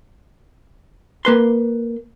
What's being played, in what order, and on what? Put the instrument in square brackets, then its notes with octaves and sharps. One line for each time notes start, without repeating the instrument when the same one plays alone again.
[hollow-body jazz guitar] A#3 B4 C6